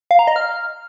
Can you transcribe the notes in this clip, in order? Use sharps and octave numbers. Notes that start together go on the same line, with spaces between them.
F5
A#5
D#5
F6